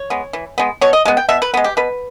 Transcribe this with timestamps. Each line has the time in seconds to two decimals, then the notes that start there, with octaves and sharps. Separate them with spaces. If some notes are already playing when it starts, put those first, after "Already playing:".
Already playing: C#5
0.10 G#3 B3
0.33 E3
0.58 G#3 B3
0.81 B2 C#5
0.93 D#5
1.05 G#3 B3
1.17 G5
1.29 B2 E5
1.42 B4
1.54 G#3 B3
1.64 G4
1.77 B2 B4